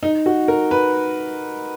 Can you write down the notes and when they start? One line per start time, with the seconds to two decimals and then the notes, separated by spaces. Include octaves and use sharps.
0.03 D#4
0.26 F#4
0.48 A#4
0.71 B4